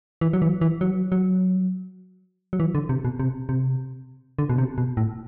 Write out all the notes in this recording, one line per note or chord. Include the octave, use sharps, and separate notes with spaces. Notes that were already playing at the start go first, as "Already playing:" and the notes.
E3
F#3
E3
E3
F#3
F#3
F#3
E3
D3
C3
B2
C3
C3
D3
B2
C3
B2
A2